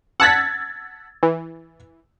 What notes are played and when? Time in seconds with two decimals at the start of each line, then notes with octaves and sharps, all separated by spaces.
0.20 F#5 A5 E6 G#6 A6 B6
1.23 E3